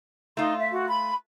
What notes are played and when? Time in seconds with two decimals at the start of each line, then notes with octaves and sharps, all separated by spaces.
0.37 A3 D#4 F4 C6
0.58 E5
0.71 F#4
0.88 B5